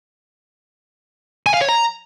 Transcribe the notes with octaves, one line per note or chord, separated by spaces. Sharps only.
G#5
F5
C#5
A#5